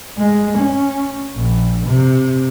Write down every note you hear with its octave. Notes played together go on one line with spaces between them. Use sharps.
G#3
C#4
A#1
C3